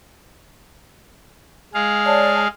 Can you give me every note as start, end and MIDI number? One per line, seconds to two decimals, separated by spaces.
1.74 2.48 56
1.74 2.48 68
1.74 2.48 77
2.06 2.42 73
2.06 2.42 74
2.06 2.42 81